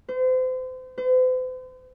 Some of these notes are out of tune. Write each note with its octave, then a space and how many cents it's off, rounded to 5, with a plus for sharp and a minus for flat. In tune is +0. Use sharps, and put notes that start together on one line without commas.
C5 -35
C5 -45